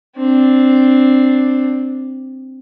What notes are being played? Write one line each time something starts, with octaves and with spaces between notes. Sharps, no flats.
C4 D4